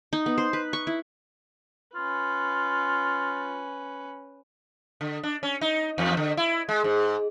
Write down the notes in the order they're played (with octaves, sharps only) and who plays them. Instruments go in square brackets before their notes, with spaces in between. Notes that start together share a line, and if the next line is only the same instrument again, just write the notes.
[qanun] D#4
B3
C5
B4
C#6
E4
[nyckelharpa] C#4 B4 [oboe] F4
[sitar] D3
D4
C#4
D#4
E2
D3
E4
G#3
G#2